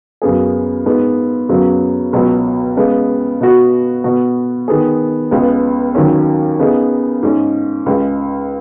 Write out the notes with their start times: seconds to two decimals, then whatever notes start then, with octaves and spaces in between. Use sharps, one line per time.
0.22 F#2 C#3 B3 G#4
0.85 G#2 G#3 B3
1.49 F#2 C#3 F#3 B3
2.13 C#2 B2 F#3 B3
2.77 C#3 G#3 B3
3.40 B2 B3 F#4
4.04 B2 B3 F#4
4.68 D#3 B3 G#4
5.31 C#2 C#3 G#3 B3
5.95 D#2 D#3 F#3 C#4
6.59 C#3 B3 D#4 G#4
7.23 G#2 G#3 C#4
7.86 C#2 C#3 G#3